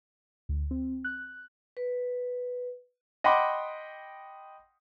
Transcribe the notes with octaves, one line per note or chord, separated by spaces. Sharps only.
D2
C4
F#6
B4
D#5 F#5 G5 B5 C6 D6